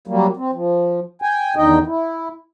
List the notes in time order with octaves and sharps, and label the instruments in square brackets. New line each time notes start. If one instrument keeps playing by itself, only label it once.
[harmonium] F#3 G3 A#3
C4
F3
G5 G#5
E2 D3 D#3 D#4 D#5 G5
E4